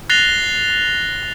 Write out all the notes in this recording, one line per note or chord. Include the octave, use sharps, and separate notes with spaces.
F#6 A6 A#6 C7 F7 G7